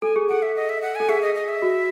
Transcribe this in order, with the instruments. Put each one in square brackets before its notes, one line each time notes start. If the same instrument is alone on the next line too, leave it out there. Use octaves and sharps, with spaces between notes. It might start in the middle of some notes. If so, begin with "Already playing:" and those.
[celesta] A4 [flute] G#5
[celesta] G#4
[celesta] A4 [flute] F#5
[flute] E5
D#5
E5
F#5
[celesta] A4 [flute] G#5
[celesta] G#4 [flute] E5
[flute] D#5
D#5
E5
[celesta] F#4